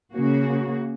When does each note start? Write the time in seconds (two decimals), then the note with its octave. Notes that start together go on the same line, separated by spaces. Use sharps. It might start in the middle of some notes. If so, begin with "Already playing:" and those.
0.12 C#3 A#3 F#4